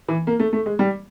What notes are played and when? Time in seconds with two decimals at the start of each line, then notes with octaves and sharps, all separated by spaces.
0.08 E3
0.27 A#3
0.39 A3
0.53 A3
0.66 G#3
0.79 G3